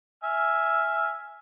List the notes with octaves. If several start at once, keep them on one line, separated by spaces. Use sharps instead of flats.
E5 G#5 F6